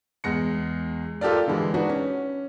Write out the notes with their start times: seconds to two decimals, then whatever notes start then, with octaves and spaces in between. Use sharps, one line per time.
0.24 E2 G#3 A#6 C#7
1.21 F4 G4 A4 A#4 D5
1.48 D3 E3 G#3
1.74 D4 D#4 F#4 B4
1.89 C#4